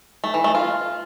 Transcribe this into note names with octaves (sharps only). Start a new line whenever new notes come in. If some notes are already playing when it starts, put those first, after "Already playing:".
A3
E3
A3
F4